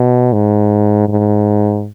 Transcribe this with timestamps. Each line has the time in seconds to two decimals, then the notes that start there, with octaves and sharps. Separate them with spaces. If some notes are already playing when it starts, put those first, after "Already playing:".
Already playing: B2
0.33 G#2
1.09 G#2